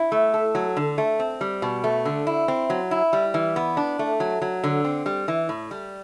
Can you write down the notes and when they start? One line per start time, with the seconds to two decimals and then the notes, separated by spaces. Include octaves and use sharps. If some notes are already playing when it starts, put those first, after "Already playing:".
Already playing: E4
0.12 A3
0.34 A4
0.55 F#3
0.77 D3
0.98 A3
1.20 C4
1.41 G3
1.62 B2
1.84 A3
2.05 D3
2.27 E4
2.48 C4
2.70 F#3
2.91 E4
3.13 G3
3.34 E3
3.56 B3
3.77 D4
3.99 A3
4.20 F#3
4.42 F#3
4.64 D3
4.85 C4
5.06 G3
5.28 E3
5.49 A2
5.71 G3